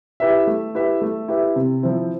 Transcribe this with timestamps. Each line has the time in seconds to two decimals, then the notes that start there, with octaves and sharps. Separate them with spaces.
0.20 E4 G4 B4 E5
0.47 A3
0.75 E4 G4 B4 E5
1.02 A3
1.28 E4 G4 B4 E5
1.56 C3
1.83 F3 C4 E4